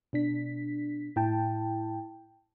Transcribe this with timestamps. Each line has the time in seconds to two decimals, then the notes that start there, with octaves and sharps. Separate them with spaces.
0.13 B2 D4 B6
1.16 A2 E4 G5 A5